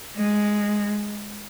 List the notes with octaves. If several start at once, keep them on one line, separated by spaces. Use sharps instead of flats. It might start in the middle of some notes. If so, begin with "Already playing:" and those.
G#3